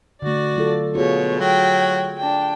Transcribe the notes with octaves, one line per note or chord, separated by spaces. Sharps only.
D3 A3 F#4 D5
F#3 F4 A4
B2 F4 F#4 G#4 C#5
F#3 G5
D4 G5